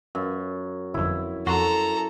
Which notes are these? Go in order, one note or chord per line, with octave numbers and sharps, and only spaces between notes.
F#2
G1 F2 E4
F2 F#4 A4 A#5 C6